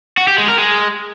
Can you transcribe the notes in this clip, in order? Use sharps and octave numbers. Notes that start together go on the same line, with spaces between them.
F#4
G4
G#3
A#4
G#3